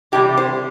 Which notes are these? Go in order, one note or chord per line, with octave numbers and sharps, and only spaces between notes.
C3 E3 G3 G4
C5